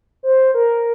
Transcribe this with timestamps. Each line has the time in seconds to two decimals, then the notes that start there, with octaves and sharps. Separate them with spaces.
0.23 C5
0.54 A#4